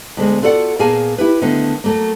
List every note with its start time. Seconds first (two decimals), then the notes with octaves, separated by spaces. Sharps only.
0.17 D2 B2 G#3
0.42 F4 F#4 A4 D5 D#5 F#5
0.79 A#2 A#3 B3 G#4 G#5 A5
1.18 E4 G4 B4
1.42 D3 D#3 A3 B3
1.84 F#3 A3 A#3